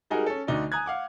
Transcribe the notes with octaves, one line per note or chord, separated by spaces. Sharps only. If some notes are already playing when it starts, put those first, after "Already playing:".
G3 G#3 D#4 F#4 G#4 A#4
C#4 A4
D2 D3 D#4 F#4 D5
G#5 A#5 D#6 F#6 G#6
F5 F#5 D6